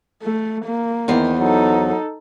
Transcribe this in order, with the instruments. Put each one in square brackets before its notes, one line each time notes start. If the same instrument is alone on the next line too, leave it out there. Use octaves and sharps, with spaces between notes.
[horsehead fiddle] A3
A#3
[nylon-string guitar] E2 B3 C5 [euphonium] D#3
[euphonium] F#3 [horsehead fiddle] D#4 A4